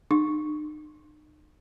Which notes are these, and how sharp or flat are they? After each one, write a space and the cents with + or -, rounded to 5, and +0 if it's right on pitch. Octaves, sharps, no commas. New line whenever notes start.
D#4 -40 C#6 +0